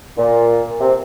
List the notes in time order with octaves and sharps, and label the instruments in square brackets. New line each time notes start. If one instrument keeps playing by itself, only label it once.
[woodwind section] A#2
C3